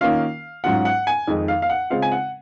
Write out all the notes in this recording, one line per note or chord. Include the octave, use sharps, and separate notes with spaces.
D#3 A#3 C#4 F4 F5
G#2 F#3 C#4 F4 F#5
F#5
G#5
F2 D#3 G#3 D#4
F5
F5
F#5
C#3 G#3 C4 F4 F5
G#5
F#5